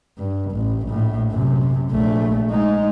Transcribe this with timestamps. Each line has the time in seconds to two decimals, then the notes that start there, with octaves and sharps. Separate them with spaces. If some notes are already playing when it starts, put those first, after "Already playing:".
0.18 G2
0.51 A1
0.87 A#1 A2
1.30 F#2 C3
1.91 A#1 A3
2.50 G#3 D#4